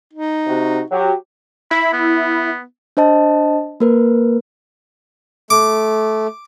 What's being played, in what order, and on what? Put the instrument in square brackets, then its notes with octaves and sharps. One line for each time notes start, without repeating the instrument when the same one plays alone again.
[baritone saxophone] D#4
[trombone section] C3 F#4
[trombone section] F#3 G4 [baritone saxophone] F#4
[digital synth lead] E4 [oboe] B5
[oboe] B3
[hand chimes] D4 C5 D#5 A5
A#3 A#4 B4
[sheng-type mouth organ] A3 [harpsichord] D6